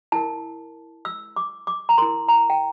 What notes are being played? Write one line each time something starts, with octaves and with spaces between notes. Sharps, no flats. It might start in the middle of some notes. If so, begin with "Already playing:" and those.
E4 A#4 A5
E6
D6
D6
A#5
E4 A#4 C6
A#5
G5